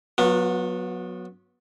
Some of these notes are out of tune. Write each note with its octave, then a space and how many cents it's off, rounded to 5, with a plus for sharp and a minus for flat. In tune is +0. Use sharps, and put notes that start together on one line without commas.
F#3 -20 B3 -15 F4 +30